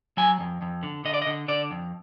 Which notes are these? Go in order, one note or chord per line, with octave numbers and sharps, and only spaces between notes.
F#3 G#5
F2
F2
D3
D3 D#5
D5
D#5
D3
D3 D5
F2